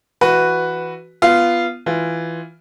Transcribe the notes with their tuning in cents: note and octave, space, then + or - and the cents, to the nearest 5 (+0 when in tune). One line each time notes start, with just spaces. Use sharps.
E3 +15 F#4 +0 B4 +0
B3 +0 F4 -15
E3 +0 F4 +0